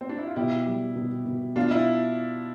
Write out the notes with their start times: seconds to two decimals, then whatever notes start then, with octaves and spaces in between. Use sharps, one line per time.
0.01 C4
0.09 D4
0.18 E4
0.27 F4
0.36 B2 E4 G4
0.66 G3
0.96 B2
1.26 B2
1.56 B2 D4 F4
1.71 E4